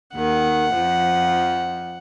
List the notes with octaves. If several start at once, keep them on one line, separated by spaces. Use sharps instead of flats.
D#2 D#3 F#5
F2 F3